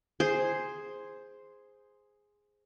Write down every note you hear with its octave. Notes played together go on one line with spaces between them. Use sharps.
G#4 C5